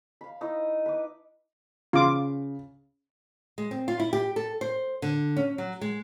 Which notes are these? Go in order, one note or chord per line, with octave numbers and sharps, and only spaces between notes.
F5 B5
D#4 E4 D#5
B4 D6
C#3 F4 D6
G#3
C4
F4
E4
G4
A4
C5
D3
C#4
F#3
G#3